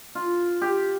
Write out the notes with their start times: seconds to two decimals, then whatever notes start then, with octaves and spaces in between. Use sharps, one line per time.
0.15 F4
0.61 G4